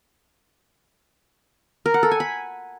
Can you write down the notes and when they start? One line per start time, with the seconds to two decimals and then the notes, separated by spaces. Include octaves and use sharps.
1.86 A#4
1.94 F#5
2.03 A4
2.11 G#5
2.20 B5